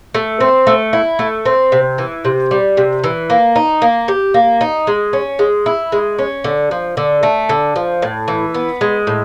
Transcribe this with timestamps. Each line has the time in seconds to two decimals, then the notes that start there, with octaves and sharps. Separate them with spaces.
0.14 A3
0.40 C4
0.67 A3
0.93 E4
1.19 A3
1.45 C4
1.72 C3
1.98 E3
2.25 C3
2.51 G3
2.77 C3
3.04 E3
3.30 A#3
3.56 D#4
3.82 A#3
4.08 G4
4.34 A#3
4.61 D#4
4.87 G#3
5.13 C#4
5.39 G#3
5.66 E4
5.92 G#3
6.19 C#4
6.44 D3
6.71 F3
6.97 D3
7.23 A3
7.49 D3
7.76 F3
8.02 A2
8.28 E3
8.54 B3
8.81 G#3
9.07 A2